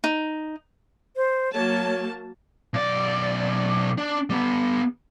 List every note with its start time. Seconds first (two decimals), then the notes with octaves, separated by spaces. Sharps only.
0.04 D#4
1.16 C5
1.54 F#3 A#3 C#5 A5
2.74 B1 D5
3.98 D4
4.30 G3 B3